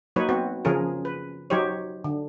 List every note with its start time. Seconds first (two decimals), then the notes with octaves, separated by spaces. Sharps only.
0.16 F#3 A#3 D#4 B4 C#5
0.29 B3 C4 F#4
0.65 C#3 F3 C#4 G#4 A#4
1.05 B4
1.50 F#3 D#4 G4 C5 C#5
2.04 D3